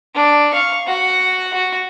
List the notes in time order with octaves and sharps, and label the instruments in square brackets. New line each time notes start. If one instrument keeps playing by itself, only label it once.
[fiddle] D4
F5 C#6
F#4 F#5
F#4